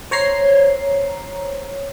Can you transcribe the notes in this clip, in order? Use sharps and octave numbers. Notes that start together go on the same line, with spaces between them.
C5 C#5 A#5 C7